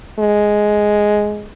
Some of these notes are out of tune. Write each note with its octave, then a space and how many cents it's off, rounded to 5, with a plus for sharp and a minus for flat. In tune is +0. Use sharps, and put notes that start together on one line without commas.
G#3 +5